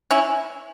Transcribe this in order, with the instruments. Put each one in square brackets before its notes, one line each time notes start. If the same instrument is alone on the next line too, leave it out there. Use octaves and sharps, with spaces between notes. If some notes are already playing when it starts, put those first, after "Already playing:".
[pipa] C#4 E4